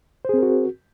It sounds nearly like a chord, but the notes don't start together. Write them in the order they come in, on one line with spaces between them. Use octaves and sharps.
C5 G#4 C4 A#4 F#4